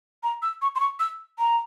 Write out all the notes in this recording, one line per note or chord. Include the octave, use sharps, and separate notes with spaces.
A#5
E6
C#6
C6
C#6
E6
A#5